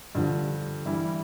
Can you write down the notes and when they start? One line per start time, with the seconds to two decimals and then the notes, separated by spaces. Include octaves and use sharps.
0.15 G2 D3 F3
0.86 G2 E3 G3 E4